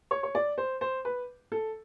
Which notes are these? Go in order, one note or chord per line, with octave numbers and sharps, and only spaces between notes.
C#5
C#5
D5
C5
C5
B4
A4